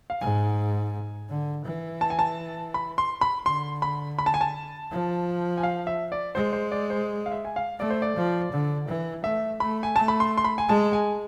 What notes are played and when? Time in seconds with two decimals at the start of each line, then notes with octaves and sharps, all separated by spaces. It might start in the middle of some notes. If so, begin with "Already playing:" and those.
0.10 F5
0.21 G#2 G#5
1.29 D3
1.65 E3
2.01 A5
2.10 G#5
2.19 A5
2.74 B5
2.98 C6
3.21 B5
3.46 D3 C6
3.82 B5
4.19 B5
4.26 A5
4.34 G#5
4.41 A5
4.91 F3
5.57 G#5
5.63 F5
5.87 E5
6.12 D5
6.35 G#3 C5
6.53 C5
6.72 D5
6.90 C5
7.26 F5
7.32 E5
7.45 G#5
7.56 F5
7.79 A3 D5
7.90 C5
8.02 D5
8.16 F3
8.52 D3
8.88 E3
9.24 A3 E5
9.60 A3 B5
9.83 G#5
9.96 A3 A5
10.08 B5
10.20 C6
10.38 C6
10.44 B5
10.58 G#5
10.68 G#3 A5
10.93 G#5